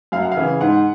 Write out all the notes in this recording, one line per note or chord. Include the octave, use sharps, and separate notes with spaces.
F#2 F5
F#5
F5
C#3 E3
G#2 F#5